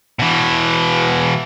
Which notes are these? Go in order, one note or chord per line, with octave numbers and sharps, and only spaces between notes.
B2 E3